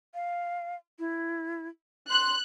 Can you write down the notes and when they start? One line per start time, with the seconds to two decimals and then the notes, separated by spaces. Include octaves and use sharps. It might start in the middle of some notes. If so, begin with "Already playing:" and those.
0.14 F5
0.99 E4
2.10 C6 F#6